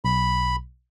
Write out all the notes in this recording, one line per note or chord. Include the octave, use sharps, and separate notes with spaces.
B1 B5